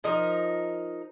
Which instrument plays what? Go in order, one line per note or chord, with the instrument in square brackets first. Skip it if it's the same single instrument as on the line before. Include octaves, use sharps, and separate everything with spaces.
[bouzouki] F3 D#4 A#4